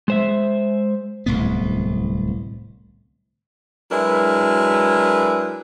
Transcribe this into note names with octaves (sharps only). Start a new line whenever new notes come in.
G#3 C5 E5
D1 C2 A2 B3
F#3 G#3 D4 E4 A#4 B4